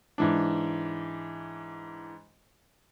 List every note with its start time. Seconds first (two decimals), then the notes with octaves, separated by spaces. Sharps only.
0.18 G#2 E3 D4